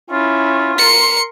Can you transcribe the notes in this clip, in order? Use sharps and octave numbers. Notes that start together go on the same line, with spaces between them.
C#4 E4 F4
A#4 C6 C#7